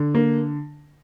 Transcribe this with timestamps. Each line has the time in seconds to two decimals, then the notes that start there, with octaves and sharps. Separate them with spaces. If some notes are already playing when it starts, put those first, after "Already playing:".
Already playing: D3
0.15 A#3